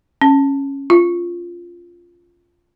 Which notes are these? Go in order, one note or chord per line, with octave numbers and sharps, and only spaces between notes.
C#4
F4